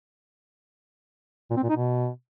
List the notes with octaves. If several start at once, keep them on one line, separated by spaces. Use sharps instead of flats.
A#2
C4
A#2
D#4
B2